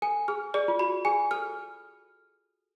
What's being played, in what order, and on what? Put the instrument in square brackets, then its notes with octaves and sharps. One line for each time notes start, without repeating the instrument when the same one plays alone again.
[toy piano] A4 [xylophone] G#5
[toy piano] G#4 [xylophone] F6
[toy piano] G#4 [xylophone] D5
[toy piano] F4
[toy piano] F#4 [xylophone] B5
[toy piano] G#4 [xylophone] G#5
[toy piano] A4 [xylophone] F6